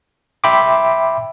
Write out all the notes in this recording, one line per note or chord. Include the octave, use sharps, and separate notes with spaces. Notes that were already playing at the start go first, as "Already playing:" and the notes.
E5 G5 B5 C6 D6